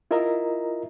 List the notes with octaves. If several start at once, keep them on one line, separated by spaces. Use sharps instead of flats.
E4 F4 A#4 D#5 E5 A#5